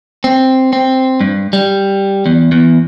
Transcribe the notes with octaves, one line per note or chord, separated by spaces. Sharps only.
C4
C4
G2
G3
E2
E2